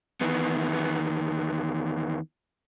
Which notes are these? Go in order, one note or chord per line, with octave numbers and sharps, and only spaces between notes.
E2 D#3 B3